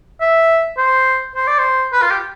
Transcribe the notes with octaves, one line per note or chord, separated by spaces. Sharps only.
E5
C5
C5
D5
C5
B4
F4
G4